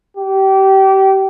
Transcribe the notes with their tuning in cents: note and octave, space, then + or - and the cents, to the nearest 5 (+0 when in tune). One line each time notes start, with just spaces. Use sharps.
G4 -25